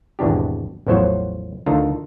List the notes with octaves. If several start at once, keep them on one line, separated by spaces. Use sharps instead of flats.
G#1 E2 B2 D4 G4
A1 E2 F3 F#3 C5 C#5
D2 D#3 D4 F4 A4 A#5